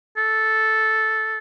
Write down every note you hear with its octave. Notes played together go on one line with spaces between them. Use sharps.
A4